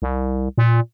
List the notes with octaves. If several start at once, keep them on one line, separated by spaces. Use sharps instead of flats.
C2
A#2